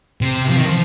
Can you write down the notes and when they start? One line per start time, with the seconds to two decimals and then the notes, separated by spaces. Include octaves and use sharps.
0.21 C3
0.49 F3
0.57 D#3
0.65 F3